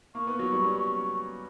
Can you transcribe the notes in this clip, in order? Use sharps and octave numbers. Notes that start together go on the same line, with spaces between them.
A#3 C#6
B3
F#3
G3
C#4